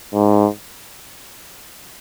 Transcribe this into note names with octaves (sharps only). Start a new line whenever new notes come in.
G#2